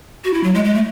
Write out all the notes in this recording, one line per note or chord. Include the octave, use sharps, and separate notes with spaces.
F#4
E4
F#3
G#3
G#3
A3